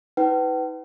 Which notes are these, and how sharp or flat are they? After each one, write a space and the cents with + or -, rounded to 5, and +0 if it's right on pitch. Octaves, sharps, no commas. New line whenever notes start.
E4 -45 B4 +20 G5 -45